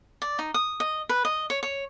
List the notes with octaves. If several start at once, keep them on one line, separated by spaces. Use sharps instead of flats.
D5
D#4
D#6
D#5
B4
D#5
C#5
C#5